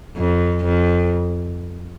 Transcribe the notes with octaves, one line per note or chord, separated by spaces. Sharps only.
F2
F2